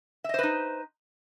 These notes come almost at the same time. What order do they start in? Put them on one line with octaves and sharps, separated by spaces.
E5 D#5 C5 B4 D#4